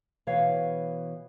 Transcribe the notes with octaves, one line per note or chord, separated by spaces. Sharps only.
B2 E3 C#5 F5